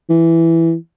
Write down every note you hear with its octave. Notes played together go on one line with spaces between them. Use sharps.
E3